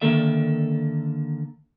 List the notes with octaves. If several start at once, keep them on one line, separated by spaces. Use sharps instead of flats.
D3 D#3 A#3 A4 E5